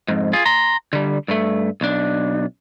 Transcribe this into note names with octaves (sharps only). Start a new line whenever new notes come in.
F2 G#2
F4 G#4
A#5 C6
D3 G3
G2 A3
B1 D4